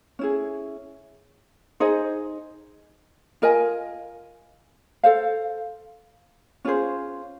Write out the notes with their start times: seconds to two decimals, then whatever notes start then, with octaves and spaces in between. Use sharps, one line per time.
0.19 C#4 E4 G#4
1.80 D#4 G#4 C5 D#5
3.42 F4 A#4 D#5 G#5
5.03 A4 C5 F5
6.65 C#4 F4 G#4 C5